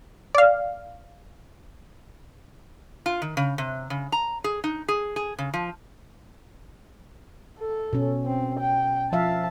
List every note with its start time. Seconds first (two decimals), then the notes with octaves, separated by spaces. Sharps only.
0.35 D5 F5
3.06 F4
3.22 D#3
3.37 C#3
3.58 C3
3.90 C#3
4.12 A#5
4.44 G#4
4.64 D#4
4.88 G#4
5.16 G#4
5.39 C#3
5.54 F3
7.59 A4
7.93 B2 C#4
8.25 C4
8.59 G5
9.12 F3 E5 F5 A5